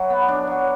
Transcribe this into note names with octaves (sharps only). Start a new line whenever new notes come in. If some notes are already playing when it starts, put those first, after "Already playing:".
Already playing: F#3 E4
B3
D4
F#3